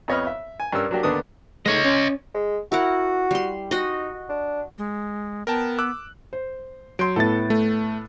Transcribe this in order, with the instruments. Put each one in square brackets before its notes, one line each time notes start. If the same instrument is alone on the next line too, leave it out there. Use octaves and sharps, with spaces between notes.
[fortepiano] F2 B3 C#5 D#5 B5 F6
E5
G#5
G2 G3 C#4 A#4 E6
F#3 A#3 D4 F#4 G4
D#2 D3 B3 D4 D#6
[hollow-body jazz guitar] G#3 A3 D#4 [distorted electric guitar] C#5 D#5
[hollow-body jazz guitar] C#4
[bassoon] G#3
[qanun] E4 A#4 F#5 [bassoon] F#4
[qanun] G3 C6
[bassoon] D#4 [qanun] F#4 D#5
[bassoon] D4
[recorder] G#3
[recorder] B3 [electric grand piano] A#4 G5 A5
[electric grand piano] D6 E6 F#6
[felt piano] C5
[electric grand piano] F#3 [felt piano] C6 G6 D7
[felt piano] A2 B3 E4 [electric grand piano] A4 A6
[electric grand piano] A3